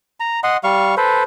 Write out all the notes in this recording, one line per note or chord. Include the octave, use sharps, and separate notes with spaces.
A#5
D#5 F#5 C6
G3 F5 C#6
A4 B4 C5